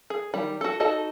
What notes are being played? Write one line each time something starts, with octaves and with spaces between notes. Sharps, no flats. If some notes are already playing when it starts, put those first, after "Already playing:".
G#4
D#3 G3 B5
F#4 A4
D#4 F#4 A4 D#5 A5